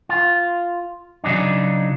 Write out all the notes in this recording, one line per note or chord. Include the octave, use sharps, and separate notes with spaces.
F4
C#3 F#3 D4 D#4